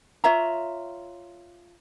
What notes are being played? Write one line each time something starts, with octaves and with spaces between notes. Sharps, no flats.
F4 C#5 E5 A#5